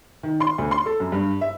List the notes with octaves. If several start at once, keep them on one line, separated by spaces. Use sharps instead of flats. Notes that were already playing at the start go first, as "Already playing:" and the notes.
D#3
C6
D2
C6
A4
F#2
G2
E5